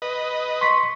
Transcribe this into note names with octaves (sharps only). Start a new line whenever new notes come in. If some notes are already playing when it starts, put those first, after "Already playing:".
B4 D#5
C6 C#6 B6